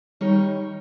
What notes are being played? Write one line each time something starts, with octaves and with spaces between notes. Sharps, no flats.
D#3 G3 D#4 A#4 C#5